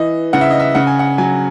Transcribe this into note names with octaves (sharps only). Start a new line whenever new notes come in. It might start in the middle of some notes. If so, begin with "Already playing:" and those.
Already playing: E3 D#5
C#3 F#5
E5
D#5
E5
C#3 F#5
G#5
F#5
F#3 G#5